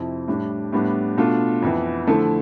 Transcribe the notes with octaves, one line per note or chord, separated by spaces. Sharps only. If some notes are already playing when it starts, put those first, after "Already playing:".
Already playing: F2 C3 F3 C4 E4
A2 G3 D4
A2 G3 B3 D4
B2 A3 D4 F4
F2 E3 B3
D3 F3 A3 E4